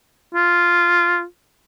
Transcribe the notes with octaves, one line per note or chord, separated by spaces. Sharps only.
F4